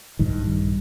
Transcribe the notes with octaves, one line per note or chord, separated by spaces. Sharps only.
A#1 G2 D#3